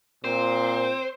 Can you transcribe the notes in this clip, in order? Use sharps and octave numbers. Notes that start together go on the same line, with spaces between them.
A#2 C4 C5